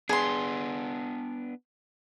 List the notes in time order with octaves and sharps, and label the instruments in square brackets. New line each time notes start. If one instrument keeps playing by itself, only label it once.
[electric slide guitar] B3 D4 [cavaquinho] G#4 C6